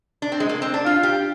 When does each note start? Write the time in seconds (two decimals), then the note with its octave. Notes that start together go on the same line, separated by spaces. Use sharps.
0.22 D4
0.32 C4
0.40 G#3
0.49 A#3
0.62 C4
0.74 D4
0.85 F4 F5
1.03 G4